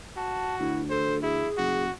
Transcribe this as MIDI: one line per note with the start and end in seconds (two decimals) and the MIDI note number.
0.17 0.82 66
0.17 0.56 81
0.60 1.44 38
0.60 0.82 64
0.90 1.19 69
0.90 1.16 72
1.23 1.49 64
1.23 1.84 68
1.58 1.88 30
1.58 1.92 66